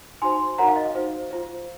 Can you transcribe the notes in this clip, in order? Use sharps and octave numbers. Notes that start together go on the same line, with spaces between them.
D#4 F#4 C5 G#5 C6
D#4 F#4 A#4 C#5 F#5 A#5
F5
D#5
F5
D#4 F#4 C5
F4 C5